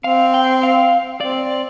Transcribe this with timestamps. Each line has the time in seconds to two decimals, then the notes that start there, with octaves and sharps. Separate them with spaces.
0.04 C4 F5
0.34 G5
0.63 F5
1.20 C4 D5